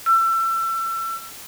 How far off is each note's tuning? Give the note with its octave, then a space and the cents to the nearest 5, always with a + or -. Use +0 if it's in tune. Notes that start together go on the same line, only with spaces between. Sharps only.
E6 +30